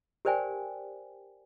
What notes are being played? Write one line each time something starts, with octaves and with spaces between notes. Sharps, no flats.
G4 A#4 C5 D5 G5 G#5